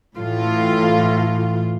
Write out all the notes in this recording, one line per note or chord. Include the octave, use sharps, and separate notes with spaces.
A2 E3 F4